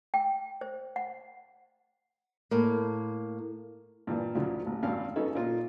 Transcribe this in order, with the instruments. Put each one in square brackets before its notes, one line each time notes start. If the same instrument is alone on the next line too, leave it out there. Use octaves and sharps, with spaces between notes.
[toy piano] G5
C5
F#5
[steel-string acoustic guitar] A2 A#3
[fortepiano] G2 A#2 E3
D2 C#3 F3 F#3
A1
G#1 G2 C#4 F5
F#3 B3 C#4 D#4 A4
A#2 F4 D#5